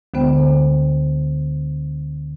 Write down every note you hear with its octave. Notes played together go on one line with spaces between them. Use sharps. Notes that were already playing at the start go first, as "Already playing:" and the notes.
D2 D3 G#3 B3 C5 G5